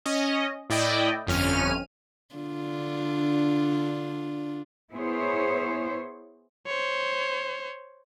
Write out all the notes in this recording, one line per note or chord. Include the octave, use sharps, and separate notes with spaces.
C#4 D#5
A2 E4 D5 D#5 G5
G1 F2 C#4 F6 D#7
D3 D4 F4
B3 E4 G#4 C5 C#5
C5 C#5